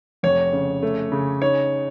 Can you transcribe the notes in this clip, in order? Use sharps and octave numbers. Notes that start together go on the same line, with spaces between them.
F1 C#5
C#3
A3
C#3
D#4 C#5